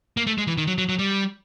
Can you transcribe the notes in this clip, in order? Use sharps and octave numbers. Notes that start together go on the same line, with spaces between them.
A#3
A3
G#3
E3
D#3
F#3
F#3
F#3
G3